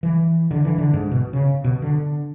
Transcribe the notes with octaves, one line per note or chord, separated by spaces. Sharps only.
E3
D3
E3
D3
G#2
B2
C#3
B2
D3